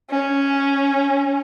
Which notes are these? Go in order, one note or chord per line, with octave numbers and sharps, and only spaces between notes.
C#4